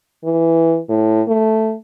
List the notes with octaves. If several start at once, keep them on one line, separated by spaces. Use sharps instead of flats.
E3
A2
A3